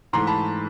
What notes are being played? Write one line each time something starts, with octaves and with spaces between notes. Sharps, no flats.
G#2 E3 A3 A#5 C6
A5 B5